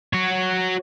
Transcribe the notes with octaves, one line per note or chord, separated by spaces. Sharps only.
F#4 C#5